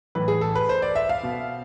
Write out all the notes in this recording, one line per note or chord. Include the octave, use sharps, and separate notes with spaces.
A2 E3 B4
G#4
A4
B4
C5
D5
E5
F5
B2